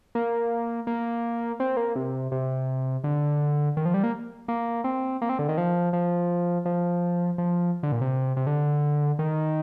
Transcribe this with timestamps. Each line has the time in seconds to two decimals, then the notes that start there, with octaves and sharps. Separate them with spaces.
0.15 A#3
0.87 A#3
1.60 C4
1.77 A#3
1.96 C3
2.32 C3
3.04 D3
3.77 D#3
3.85 F3
3.94 G3
4.04 A#3
4.48 A#3
4.84 C4
5.22 A#3
5.29 C4
5.39 D3
5.49 D#3
5.58 F3
5.93 F3
6.65 F3
7.38 F3
7.83 D3
7.92 A#2
8.01 C3
8.37 C3
8.47 D3
9.19 D#3